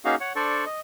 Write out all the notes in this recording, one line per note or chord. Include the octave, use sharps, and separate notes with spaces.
A#3 C#4 D#4 F#4 G#4 F5
C#5 F#5
D4 A4 C5 D5 C#6
D#5